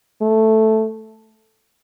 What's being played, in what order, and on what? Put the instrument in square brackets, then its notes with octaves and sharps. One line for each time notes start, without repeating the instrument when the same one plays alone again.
[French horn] A3